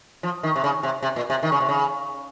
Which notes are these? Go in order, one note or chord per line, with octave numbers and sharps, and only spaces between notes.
F3
D#3
C3
C#3
C3
C3
A#2
C3
D#3
C#3
C3
C#3